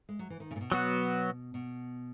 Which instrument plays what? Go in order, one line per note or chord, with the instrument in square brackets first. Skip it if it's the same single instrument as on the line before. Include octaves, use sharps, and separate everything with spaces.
[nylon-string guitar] G#3
F#3
E3
D#3
C#3
A#2
B2
[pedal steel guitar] F#3 B3 F#4
[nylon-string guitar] B2